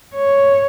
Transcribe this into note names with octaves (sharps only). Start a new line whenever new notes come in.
C#5